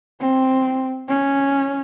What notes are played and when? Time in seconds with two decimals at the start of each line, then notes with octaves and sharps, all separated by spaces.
0.21 C4
1.09 C#4